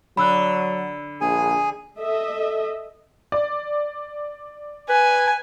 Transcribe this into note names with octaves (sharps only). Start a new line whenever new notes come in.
D3 F#3 B5 E6 F#6
A#1 G#4 G#5
A4 D#5 E5
D5
B4 G#5